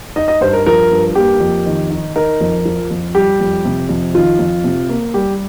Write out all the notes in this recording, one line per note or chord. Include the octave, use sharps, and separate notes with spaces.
D#4 D#5
D#5
G2 C5
A#4
F3 A#4
G2
A#3 G4
F2
D#3
D#4
D#4 A#4
F2
F3
F2
G3 G4
F2
C3
F2
D#3 F4
F2
C3
A#3
G3 G4